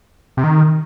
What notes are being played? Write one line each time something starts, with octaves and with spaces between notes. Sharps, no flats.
C3
D#3